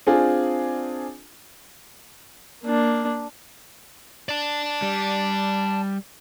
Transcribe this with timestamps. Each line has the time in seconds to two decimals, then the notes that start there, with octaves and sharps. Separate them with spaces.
0.07 C4 D4 F4 G#4
2.64 A#3 D4
4.29 D5 A5
4.82 G3